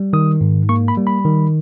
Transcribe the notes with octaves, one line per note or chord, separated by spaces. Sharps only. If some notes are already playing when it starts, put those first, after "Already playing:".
Already playing: G3
D#3 D#6
G#2
A#3 C#6
B5
G3
B5
D#3